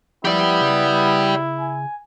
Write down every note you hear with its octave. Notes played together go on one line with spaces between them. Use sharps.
F3 B3 E4 G4 D5
C#3
G#5